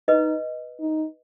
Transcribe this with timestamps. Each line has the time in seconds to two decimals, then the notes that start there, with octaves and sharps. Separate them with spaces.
0.08 D#4 B4 D#5
0.80 D#4